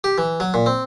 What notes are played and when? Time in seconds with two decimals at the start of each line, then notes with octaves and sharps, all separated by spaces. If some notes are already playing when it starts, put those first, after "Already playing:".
0.04 G4
0.18 E3
0.40 F#3
0.54 A#2
0.66 C4